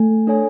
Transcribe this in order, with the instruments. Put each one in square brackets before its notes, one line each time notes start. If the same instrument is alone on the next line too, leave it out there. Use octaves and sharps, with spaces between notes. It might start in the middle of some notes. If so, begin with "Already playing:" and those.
Already playing: [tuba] A3 [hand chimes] G#5
[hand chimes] D4 A4 C#5 G#5